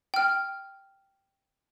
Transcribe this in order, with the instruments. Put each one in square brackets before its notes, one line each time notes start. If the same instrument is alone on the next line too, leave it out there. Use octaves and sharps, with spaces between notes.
[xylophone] G5 F6